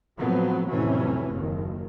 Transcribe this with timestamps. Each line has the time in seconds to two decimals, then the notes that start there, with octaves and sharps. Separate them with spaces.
0.19 A2 F3 F#3 B3 C4
0.68 F2 A2 C3 E3 F#3 C#4
1.31 F#1 D#2 D#3